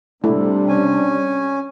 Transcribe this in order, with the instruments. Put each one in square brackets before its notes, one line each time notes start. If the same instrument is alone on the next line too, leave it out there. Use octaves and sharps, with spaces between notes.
[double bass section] C3 G3 [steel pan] A3 E4 [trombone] D4
[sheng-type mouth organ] C#4 G#5